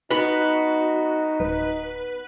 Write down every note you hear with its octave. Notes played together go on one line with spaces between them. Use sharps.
B3 D#4 F#4
D1 B4